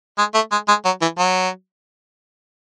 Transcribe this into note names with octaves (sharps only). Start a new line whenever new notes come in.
G#3
A3
G#3
G#3
F#3
E3
F#3